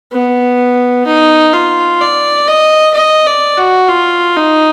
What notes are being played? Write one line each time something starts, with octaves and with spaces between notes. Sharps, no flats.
B3
D#4
F4
D5
D#5
D#5
D5
F#4
F4
D#4